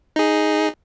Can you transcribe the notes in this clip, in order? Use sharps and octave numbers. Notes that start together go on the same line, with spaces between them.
D#4 G#4